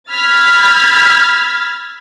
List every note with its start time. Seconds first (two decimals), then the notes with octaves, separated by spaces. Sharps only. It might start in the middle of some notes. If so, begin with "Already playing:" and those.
0.11 B5 E6 F6 G#6 A6 B6